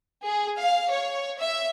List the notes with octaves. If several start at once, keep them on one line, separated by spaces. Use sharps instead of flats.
G#4
F5
C#5
E5